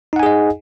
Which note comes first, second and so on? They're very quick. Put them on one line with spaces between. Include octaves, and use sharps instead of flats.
D#4 F#5 G#5 G#4 D#5